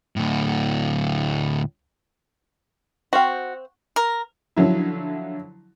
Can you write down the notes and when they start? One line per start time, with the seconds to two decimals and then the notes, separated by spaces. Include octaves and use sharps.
0.16 D2 A2
3.13 C4 F#4 C5 F5
3.96 A#4
4.56 D3 F3 F#3 E4